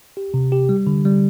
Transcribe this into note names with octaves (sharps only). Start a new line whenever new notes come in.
G4
C3
G4
G3
D3
G3